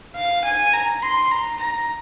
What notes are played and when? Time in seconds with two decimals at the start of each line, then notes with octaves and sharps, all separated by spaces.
0.16 F5
0.44 G#5
0.73 A#5
1.02 C6
1.32 A#5
1.60 A#5